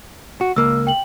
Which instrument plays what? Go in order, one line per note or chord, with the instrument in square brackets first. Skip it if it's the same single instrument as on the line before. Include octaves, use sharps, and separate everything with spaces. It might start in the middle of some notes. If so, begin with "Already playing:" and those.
[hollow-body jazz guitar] F#4
[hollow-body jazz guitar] C#2 A#3 [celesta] E6
[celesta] G5 F#7